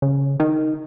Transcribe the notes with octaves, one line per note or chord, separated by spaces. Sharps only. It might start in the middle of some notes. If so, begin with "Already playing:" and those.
C#3
D#3